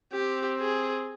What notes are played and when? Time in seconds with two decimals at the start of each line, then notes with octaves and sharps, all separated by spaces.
0.12 C4 G4
0.60 G#4